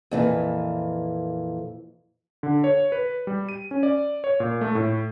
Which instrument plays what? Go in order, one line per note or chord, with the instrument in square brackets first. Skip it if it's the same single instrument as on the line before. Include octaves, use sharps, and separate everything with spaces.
[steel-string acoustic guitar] F2 A#2 E3
[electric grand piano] D3
C#5
B4
G3
D#7
C#4
D5
C#5
A#2
A3
A2